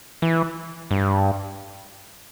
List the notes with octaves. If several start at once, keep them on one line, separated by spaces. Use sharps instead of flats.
E3
G2